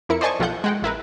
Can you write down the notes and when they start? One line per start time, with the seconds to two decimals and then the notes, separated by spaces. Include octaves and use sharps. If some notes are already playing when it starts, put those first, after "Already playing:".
0.09 F2 E4 A#4 C#7
0.21 C5 D5 D#5 G#5 A5 C#6
0.39 B1 F3 A3 F4 F#5 G6
0.64 G#3 F#5 G5
0.82 A1 E4 A#4 B4